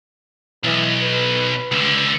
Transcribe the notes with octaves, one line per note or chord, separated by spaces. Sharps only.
B1 E3
B4
C#2 D3